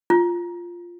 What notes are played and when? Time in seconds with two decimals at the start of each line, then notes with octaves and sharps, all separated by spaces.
0.10 F4